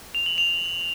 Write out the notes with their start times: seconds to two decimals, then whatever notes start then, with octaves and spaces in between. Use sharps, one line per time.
0.15 F7
0.26 F#7
0.38 F7